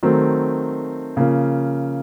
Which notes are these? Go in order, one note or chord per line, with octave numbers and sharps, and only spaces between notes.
D#3 F#3 A3 C4
C#3 F3 A#3